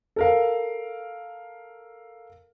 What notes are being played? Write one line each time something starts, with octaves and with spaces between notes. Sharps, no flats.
A4 A#4 F5